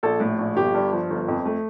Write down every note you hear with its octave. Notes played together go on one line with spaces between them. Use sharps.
A#1 A4
A2
A#1
G1 G4
G2
F3
G1
F2
A3